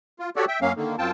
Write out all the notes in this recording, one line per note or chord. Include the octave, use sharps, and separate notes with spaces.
F4
F#4 G4 A4 C#5 D5
E5 G5
F#2 F#3 A#3 C#4 F5
D3 D#3 A#3
F#2 C4 F4 G5 A5